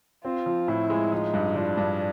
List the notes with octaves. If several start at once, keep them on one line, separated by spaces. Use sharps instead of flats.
C4 F4
F3
A2 E4
G#3
F3 D#4
G2
F3 D4
G2